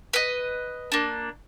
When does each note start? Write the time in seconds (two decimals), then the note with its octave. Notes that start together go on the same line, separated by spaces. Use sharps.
0.13 B4 D#5
0.92 A#3 D4